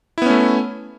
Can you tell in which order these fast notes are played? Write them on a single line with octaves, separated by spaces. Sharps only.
E4 B3 C#4 A3